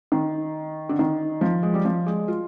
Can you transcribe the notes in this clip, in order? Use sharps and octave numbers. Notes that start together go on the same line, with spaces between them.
D#3
D3
D#3
F3
G#3
G3
F3
G#3
F4